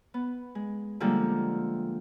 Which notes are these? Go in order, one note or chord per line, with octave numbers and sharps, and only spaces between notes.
B3
G#3
D3 F3 G3 G#3 A#3